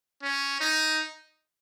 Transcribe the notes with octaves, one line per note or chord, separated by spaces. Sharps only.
C#4
D#4